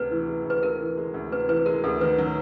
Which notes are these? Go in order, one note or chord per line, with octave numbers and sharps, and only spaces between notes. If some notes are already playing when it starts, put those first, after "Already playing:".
Already playing: D2 C3 G#3 B4
E3
G#3
D2 B4
C3 A#4
E3
G#3
D2
C3 B4
E3 B4
G#3 A#4
D2 A4
D#3 B4
F#3